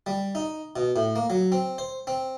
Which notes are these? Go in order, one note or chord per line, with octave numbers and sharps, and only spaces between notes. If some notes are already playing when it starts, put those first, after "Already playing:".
G3
D#4
B2
A2
A#3
F#3
C4
C5
C4